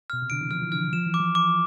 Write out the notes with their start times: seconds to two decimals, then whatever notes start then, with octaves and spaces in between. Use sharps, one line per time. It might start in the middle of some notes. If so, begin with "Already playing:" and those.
0.10 B2 F6
0.22 C3
0.30 D3 D7
0.41 E3
0.51 F3 F6
0.62 E3
0.72 D3 F6
0.93 F3 E7
1.06 E3
1.14 D6
1.20 F3
1.35 D6